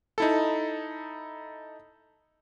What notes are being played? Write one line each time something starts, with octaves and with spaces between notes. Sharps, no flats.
D#4 E4 A4